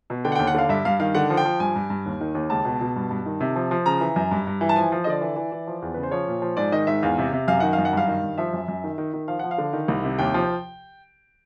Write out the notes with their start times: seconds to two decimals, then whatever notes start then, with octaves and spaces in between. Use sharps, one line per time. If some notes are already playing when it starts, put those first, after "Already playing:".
0.10 B2
0.25 D3 G5
0.32 F#5
0.35 D#2 G5
0.47 F#5
0.55 D3 F5
0.69 G2 E5
0.85 G2 F5
1.00 D#3 F5
1.15 D3 F#5
1.30 F3
1.37 G5
1.45 F3
1.60 G2 G#5
1.76 G2
1.90 G2
2.06 D#2
2.21 D#3
2.35 D#2
2.50 C#2 A5
2.65 B2
2.81 B2
2.96 G2
3.11 G2
3.26 D#3
3.40 C3
3.56 F3
3.71 F3
3.86 C#3 A#5
4.00 E3
4.16 F#2
4.31 G2
4.47 G2
4.61 E3
4.69 A5
4.76 F3 G#5
4.92 F3
5.04 D#5
5.07 D3 D5
5.21 E3
5.36 E3
5.52 E3
5.67 F3
5.82 E2
5.94 C#3 B4
6.03 C5
6.11 F3 C#5
6.28 A#2
6.42 F3
6.57 G#2 D5
6.72 D#3 D#5
6.87 G#2 E5
7.03 E2 F5
7.18 C3
7.32 C3
7.48 F#2 F5
7.60 D#3 F#5
7.73 F5
7.78 F#2
7.85 F#5
7.93 G2 F5
8.08 D#3
8.23 G2
8.38 F3 E5
8.53 F#2
8.68 F#2
8.84 D#3
8.98 D#3
9.14 D#3
9.28 F3 F5
9.39 F3 F#5
9.51 F5
9.58 D3
9.73 D#3
9.88 C2
10.04 C3
10.19 D#2 G5
10.34 F3